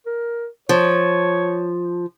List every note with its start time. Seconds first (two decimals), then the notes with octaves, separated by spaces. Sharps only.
0.06 A#4
0.69 F3 C#5